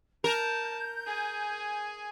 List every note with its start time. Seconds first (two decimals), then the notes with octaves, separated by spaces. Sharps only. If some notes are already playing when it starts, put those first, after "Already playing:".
0.24 A#4 A5 G6
1.06 G#4 G#5